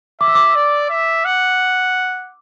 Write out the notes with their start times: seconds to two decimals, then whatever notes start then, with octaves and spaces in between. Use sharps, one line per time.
0.21 E5 D6
0.28 E6
0.35 D6
0.55 D5
0.90 E5
1.25 F#5